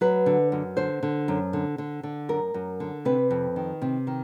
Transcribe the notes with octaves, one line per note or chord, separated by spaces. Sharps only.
F#3 B4
D3
F#2
D3 C5
D3
F#2
D3
D3
D3
F#2 A#4
F#2
D3
C3 B4
F2
D#3
C3
D#3